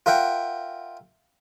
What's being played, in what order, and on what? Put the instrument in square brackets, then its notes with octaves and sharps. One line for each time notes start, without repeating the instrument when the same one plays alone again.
[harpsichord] F4 A#4 E5 F#5 G5